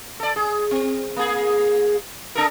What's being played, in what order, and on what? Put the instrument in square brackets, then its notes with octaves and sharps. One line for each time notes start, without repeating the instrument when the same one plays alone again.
[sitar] A4 D5
G#4
C4
A#3 G#4
D4 A4 A#4